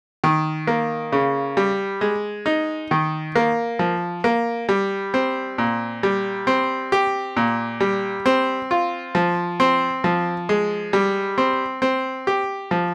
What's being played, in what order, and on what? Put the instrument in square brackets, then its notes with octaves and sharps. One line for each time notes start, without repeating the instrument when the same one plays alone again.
[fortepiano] D#3
A#3
C#3
G3
G#3
D#4
D#3
A#3
F3
A#3
G3
C4
A#2
G3
C4
G4
A#2
G3
C4
F4
F3
C4
F3
G#3
G3
C4
C4
G4
F3